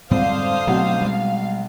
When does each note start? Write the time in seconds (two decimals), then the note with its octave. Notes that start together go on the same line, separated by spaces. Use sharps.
0.11 F2 G#2 D3 G3 C4 C5 F5 D#6
0.67 B1 F#3 A3 C4 F#5
1.01 G3 G#3